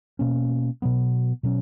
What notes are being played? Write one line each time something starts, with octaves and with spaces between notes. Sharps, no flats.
B2 A#3 C#4
B2 F#3 B3
B2 F#3 C#4